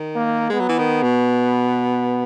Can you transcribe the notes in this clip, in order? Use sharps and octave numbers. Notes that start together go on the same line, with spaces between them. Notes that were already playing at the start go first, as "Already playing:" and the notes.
Already playing: D#3
A#3
G#3 B3
F#3
E3
D#3
B2